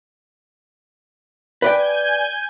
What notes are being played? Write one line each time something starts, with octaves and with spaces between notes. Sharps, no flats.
B4 D5 G5 G#5 G6 G#6